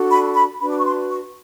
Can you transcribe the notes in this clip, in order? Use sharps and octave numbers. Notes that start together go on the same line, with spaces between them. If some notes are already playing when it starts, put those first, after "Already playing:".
Already playing: D4 F#4 A4
B5
B5
D4 F#4 B4 B5
D6
C#6
C6
C#6